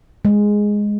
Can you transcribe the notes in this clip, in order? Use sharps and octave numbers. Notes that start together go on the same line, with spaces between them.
G#3